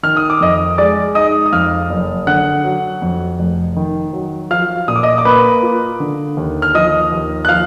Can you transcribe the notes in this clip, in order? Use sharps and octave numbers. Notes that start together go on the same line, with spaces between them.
D#3 F6
D#6
D6
F2 D#5 D#6
G#3 D5 D6
D#4 D#5 D#6
D#6
F2 F5 F6
F#1
D3 F#5 F#6
F#3
F2
F1
D#3
F#3
F3 F5 F6
A#2 D#6
D6
D#5 D#6
D6
A#3 B4 B5
F4
D3
D#2
F6
F3 D#5 D#6
D#2
F#6
F3 F5 F6